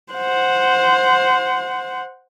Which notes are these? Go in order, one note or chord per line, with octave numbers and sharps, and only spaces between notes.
C5 F#5